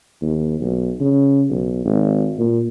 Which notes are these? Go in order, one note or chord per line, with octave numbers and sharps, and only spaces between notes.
D#2
B1
C#3
B1
G#1
A#2